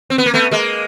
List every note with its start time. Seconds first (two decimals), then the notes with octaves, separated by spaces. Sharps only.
0.10 C4
0.18 B3
0.26 A#3
0.34 A3 B3
0.51 G#3 A#3